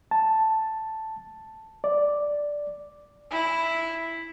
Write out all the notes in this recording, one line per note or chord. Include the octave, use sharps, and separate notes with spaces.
A5
D5
E4